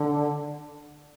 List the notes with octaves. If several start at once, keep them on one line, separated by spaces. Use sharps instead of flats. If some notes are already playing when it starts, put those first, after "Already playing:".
Already playing: D3